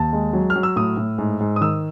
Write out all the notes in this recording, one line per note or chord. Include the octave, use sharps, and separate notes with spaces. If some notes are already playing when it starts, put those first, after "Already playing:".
Already playing: D#2 A5
G#3
F#3
F6
F#3
E6
A2 D#6
A2
G#2
G#2
D#6
D#3 E6